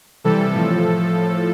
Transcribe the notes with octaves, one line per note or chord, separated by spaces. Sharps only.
C3 E3 G3 A4
A2 F3